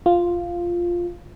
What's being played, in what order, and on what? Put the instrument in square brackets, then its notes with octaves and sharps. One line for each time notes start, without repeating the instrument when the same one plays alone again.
[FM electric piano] F4